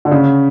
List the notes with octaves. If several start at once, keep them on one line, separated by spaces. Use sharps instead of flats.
D3
C#3